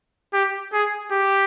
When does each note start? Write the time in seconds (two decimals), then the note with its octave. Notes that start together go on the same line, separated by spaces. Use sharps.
0.33 G4
0.73 G#4
1.12 G4